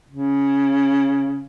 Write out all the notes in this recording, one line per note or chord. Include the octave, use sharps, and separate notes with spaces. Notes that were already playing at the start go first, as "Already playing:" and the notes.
C#3